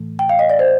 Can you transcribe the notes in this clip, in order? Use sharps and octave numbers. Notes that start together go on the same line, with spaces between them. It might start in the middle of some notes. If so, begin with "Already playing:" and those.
Already playing: A2 E3 A3
G5
F5
D#5
D5
C5